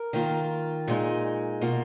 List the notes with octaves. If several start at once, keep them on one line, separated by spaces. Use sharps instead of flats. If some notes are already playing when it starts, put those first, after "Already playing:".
Already playing: A#4
D#3 A#3 F4
A#2 G#3 D#4
B2 A#3 F4